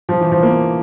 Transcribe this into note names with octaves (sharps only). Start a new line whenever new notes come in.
F3
E3
F3
A#3